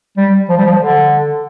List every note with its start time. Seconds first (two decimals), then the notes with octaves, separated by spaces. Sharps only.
0.17 G3
0.49 F3
0.57 G3
0.65 F3
0.79 D3